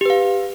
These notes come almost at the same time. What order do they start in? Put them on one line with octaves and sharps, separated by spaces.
G4 B4 F5